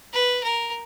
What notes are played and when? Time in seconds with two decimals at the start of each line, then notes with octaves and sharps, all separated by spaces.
0.13 B4
0.44 A#4